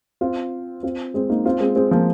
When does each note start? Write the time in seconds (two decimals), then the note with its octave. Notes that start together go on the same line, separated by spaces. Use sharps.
0.21 C4 F4
0.83 C4 F4
1.14 G#3 C4
1.29 A#3 D#4
1.45 C4 F4
1.60 G#3 C4
1.76 G#3 C4
1.91 F3 A#3